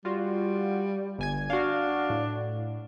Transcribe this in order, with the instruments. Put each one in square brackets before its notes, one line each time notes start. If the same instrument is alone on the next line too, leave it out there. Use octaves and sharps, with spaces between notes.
[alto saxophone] G3 [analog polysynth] F4 F#4
[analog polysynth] G1 G#5 G#6
[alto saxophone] D4 [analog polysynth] F#4 F5
[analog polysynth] A2